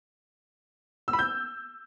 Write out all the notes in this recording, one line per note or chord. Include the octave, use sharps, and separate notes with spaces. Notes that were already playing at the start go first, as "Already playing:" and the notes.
E6
B5
G6